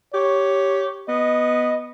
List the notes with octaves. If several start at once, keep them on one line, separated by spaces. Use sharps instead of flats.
G4 C#5
B3 D#5